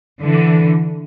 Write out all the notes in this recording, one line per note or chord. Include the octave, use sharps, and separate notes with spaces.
D3 E3